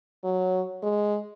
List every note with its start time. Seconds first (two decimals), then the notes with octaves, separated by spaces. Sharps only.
0.24 F#3
0.83 G#3